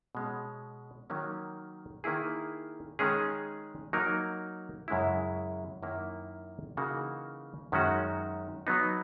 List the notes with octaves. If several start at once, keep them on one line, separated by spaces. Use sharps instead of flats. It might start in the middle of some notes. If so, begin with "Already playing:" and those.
B2 G#3 C#4
D#3 F#3 A#3 C#4
D#3 A#3 E4 G#4
D#3 G#3 C#4 G#4
F#3 A#3 D#4 A#4
F#2 C#3 G#3 C#4 E4
F#2 D#3 A#3 E4
C#3 E3 A#3 D#4 F#4
F#2 D#3 G#3 C#4 F#4
F#3 B3 D#4